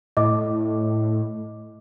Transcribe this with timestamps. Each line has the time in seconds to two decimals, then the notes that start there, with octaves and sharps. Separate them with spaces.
0.17 A2 D#5 D6